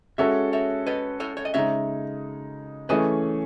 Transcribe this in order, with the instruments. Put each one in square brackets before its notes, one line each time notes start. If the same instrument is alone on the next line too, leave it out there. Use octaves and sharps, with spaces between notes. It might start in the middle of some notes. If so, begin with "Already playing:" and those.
[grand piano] G#3 C#4 F#4 A4 [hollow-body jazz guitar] C#5 E5
[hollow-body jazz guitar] C#5 E5
B4 D#5
A4 C#5
C#5
D#5
[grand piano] C#3 G#3 D#4 [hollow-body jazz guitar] C#5 E5
[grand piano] E3 A3 C#4 G#4 [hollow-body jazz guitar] B4 D#5